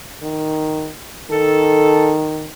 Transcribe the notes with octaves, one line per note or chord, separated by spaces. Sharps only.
D#3
D#3 A4